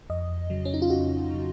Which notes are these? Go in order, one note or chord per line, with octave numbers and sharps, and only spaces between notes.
F2 D#5
C#3 F#3
C#4
D#4
F4
F2 F#4
C#3 F#3